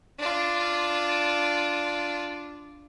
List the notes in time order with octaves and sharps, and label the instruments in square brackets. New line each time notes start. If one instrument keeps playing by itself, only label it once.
[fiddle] D4 F4